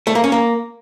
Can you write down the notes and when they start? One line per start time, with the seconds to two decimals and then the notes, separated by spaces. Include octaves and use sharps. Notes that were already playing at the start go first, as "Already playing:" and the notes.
0.07 A3
0.15 A#3
0.24 C#4
0.32 A#3